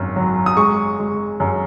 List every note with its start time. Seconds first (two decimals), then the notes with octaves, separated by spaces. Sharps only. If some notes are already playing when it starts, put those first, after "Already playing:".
Already playing: G#1 F#2
0.16 F#3
0.46 D#6
0.57 G#3 C#6
0.99 G#3
1.40 F#2